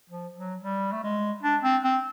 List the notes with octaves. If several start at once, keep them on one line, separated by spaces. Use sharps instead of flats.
F3
F#3
G3
A3
G#3
D4
C4
C4